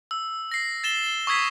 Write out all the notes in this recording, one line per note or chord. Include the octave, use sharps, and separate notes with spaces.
E6
A#6 C7
A6 E7 G7
G7
C#6 D#6 E6 G#6 B6 C7